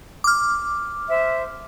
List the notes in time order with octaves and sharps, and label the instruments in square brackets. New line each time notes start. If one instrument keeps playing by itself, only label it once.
[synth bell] D6 F6
[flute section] C5 E5